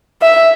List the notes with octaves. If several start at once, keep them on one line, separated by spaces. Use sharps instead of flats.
E5